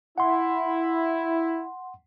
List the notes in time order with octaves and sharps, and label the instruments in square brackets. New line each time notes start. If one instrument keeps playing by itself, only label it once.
[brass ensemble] E4 [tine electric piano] F#5 C6